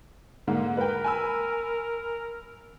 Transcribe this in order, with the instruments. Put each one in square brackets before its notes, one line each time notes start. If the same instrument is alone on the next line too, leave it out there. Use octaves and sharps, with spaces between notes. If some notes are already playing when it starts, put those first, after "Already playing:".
[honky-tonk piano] G#2 D3 A#3
[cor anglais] A#4 [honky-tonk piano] B4 G5
[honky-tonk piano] G#5 B5 E6